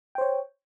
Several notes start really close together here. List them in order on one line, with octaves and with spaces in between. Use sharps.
G5 C5 C#5